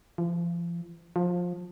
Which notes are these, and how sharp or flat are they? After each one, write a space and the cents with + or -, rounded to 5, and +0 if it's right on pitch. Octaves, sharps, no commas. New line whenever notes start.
F3 -35
F3 +20